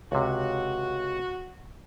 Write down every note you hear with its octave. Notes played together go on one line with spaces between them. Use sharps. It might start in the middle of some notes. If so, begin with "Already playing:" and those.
C#2 C3 F#4